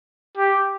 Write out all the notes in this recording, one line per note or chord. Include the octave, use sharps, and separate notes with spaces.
G4